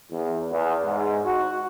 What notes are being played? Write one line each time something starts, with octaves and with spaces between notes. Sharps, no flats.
E2
E2
G#2
F#4